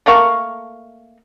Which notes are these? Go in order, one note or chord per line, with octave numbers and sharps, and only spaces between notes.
A3 A#3 F5 C#6